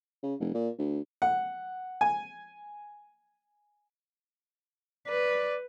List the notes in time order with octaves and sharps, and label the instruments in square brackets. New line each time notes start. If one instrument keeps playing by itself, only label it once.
[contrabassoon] C#3
F1
A#2
D2
[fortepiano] F#5
G#5
[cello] B4 [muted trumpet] D5